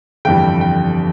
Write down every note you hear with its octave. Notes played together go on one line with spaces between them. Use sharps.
G1 F2 E3 G3 G5
G5